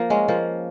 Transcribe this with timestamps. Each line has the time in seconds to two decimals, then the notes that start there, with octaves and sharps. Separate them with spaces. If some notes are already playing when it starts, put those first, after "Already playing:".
Already playing: F3 A#3
0.10 G#3 C#4
0.28 F3 A#3